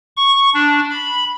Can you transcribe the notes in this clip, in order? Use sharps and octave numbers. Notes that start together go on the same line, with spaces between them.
C#6
D4
B5